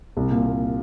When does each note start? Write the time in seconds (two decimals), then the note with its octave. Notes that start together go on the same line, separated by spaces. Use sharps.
0.17 C2
0.31 A#2
0.46 A#2